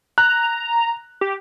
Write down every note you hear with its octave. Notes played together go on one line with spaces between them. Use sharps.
A#5 F#6
G4